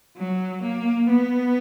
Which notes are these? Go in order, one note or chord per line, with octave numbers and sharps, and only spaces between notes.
F#3
A#3
B3